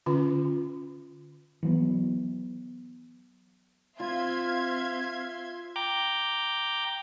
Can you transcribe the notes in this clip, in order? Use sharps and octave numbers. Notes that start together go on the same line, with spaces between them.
D3 C#4 F4 B4
E3 F#3 B3
C4 F4 E5 F5 C6 G#6
G5 A#5 D6 G6